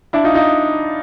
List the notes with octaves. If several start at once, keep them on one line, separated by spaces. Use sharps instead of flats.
D4 E4
D#4 F4
D#4 F4